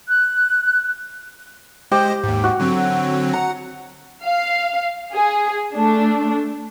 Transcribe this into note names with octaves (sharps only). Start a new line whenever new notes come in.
F#6
G#3 G4 C5 D#5
D#2 G#2
F#4
D3 F#3 C4
F#5 A#5
F5
G#4
A3 D4